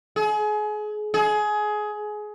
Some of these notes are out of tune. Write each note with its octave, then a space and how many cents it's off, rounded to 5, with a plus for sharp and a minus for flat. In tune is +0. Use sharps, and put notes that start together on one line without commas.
G#4 +30
G#4 +20